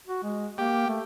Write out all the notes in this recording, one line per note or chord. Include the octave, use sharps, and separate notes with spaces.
F#4
G#3
A#3 G4
A3